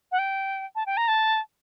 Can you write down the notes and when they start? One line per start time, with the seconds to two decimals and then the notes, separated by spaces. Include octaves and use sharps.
0.12 F#5
0.19 G5
0.75 A5
0.86 G5
0.97 A#5
1.08 A5